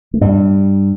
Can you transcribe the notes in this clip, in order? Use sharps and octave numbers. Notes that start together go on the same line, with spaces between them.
A3
G2 G3